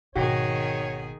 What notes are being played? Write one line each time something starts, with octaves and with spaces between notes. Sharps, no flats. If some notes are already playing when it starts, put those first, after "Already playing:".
G#1 B2 D#3 F#4 G#4 C#5 G5